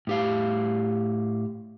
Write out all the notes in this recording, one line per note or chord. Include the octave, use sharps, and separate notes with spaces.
A2 G4 F5